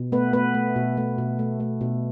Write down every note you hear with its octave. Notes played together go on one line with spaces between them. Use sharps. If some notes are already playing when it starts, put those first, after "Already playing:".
Already playing: B2
A3 B3 B4
A3 B3 B4
A3
B2
A3
B2
A3
A3
B2